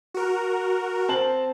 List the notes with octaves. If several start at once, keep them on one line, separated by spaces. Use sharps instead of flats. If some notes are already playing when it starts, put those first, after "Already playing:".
F#4 A#4
C4 A5 F#7